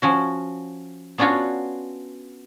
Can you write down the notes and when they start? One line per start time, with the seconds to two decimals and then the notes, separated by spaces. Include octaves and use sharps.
0.02 F3 C#4 F#4
1.18 B3 C#4 D4 F4 F#4 C#5